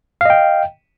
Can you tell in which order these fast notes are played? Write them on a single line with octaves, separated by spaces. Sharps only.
F5 D#5 G5